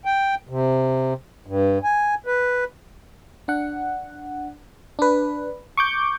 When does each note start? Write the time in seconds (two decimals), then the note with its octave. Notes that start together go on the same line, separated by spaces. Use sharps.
0.05 G5
0.49 C3
1.46 G2
1.84 G#5
2.26 B4
3.48 D4 F#5
4.99 D4 B4
5.77 C#6 D6 G6